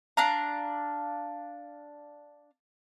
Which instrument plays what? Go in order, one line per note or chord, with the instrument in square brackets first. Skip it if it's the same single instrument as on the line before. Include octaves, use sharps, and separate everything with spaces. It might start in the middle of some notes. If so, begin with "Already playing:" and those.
[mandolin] D4 F5 A#5